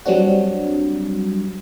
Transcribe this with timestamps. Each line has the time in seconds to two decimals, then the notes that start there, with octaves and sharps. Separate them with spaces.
0.05 F#3 G3 C4 D4 F#4